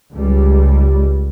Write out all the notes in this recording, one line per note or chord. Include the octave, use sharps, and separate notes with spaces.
C#2 G3